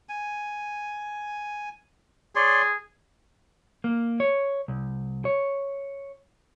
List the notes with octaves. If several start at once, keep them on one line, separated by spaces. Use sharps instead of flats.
G#5
G#4 C#5 D5 C6
A#3
C#5
C2
C#5